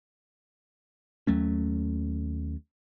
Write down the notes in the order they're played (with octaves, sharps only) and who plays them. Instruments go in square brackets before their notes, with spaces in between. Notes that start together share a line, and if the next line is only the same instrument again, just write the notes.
[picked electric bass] D#2 F#3 A3 C#4